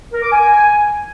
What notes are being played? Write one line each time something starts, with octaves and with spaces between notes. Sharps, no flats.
A#4
D6
G#5